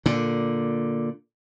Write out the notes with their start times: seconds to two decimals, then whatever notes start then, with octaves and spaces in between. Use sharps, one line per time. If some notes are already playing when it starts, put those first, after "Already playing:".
0.06 A#2 D3